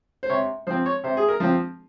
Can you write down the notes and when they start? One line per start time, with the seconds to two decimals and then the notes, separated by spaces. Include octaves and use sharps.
0.23 C5
0.30 C3 C#5
0.67 F3 C4 C5
0.86 C#5
1.04 C3 C5
1.17 G#4
1.28 A#4
1.40 F3 C4